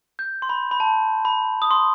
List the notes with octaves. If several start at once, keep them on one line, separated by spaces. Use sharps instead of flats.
G6
C6
B5
B5
A5
B5
D#6
C6